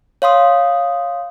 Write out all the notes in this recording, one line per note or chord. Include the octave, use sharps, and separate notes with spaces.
C#5 F5 C6 D#6